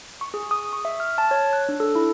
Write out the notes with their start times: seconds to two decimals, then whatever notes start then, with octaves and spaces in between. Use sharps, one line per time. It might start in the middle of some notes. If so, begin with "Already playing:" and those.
0.21 C#6
0.34 G#4
0.51 D#6
0.73 C#6
0.85 E5
1.00 F6
1.18 A5
1.31 C#5
1.53 F#6
1.69 D4
1.80 A4
1.95 E4